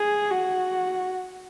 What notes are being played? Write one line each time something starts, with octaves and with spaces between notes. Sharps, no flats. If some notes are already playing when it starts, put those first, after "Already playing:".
Already playing: G#4
F#4